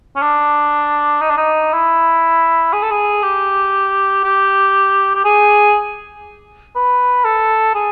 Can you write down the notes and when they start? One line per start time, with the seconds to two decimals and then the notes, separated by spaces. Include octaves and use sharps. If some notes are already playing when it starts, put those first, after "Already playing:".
0.16 C#4
0.22 D4
1.21 D#4
1.30 D4
1.37 D#4
1.73 E4
2.73 G#4
2.82 A4
2.91 G#4
3.22 G4
4.24 G4
5.15 G4
5.25 G#4
6.75 B4
7.25 A4
7.75 G#4